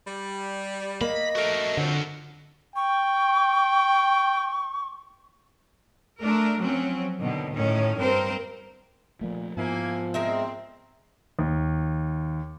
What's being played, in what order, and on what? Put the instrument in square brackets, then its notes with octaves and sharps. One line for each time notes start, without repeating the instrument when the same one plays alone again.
[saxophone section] G3
[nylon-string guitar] A#3 [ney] D#5 [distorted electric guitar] B5
[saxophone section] A3 [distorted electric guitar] F#4 A#4
[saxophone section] F2 C4 C#5 [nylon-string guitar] D3
[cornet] G5 [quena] C#6
[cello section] A3 D4 A#4
F3 F#3 C4 C#4
B2 D3 D#3 F#3
A2 D#3 C#4
G2 C4 A#4 C5
[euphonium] A#2 [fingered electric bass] F3 A3
[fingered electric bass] G#2 B3 [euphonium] F3 [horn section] A#3 E4 G#5
[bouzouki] G#3 A#4 E5 [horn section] C4
[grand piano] D#2